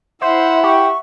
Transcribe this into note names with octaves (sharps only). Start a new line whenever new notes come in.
E4 C5 E5 F#5
G4 C#6